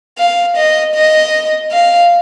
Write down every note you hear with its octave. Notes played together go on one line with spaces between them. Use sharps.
F5
D#5
D#5
F5